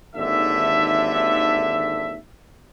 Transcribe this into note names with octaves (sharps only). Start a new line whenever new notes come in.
G#1 D#2 D3 A4 E5